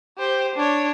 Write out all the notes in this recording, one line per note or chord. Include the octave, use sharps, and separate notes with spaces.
G4 C5
D4 C#5